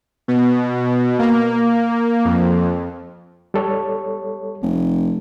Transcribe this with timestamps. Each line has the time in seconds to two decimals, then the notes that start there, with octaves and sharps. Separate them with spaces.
0.28 B2
1.19 A#3
2.25 F2
3.54 G3 A4 C#5
4.62 F1